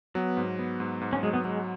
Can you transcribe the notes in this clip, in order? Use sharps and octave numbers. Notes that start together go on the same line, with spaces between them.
F#3 B3
G#2
B3
G#2
G#2
C#4
F#3 G#3
B3
F#3 G#3